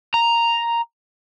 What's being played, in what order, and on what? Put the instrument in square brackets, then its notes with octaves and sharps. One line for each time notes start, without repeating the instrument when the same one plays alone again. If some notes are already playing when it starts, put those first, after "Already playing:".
[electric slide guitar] A#5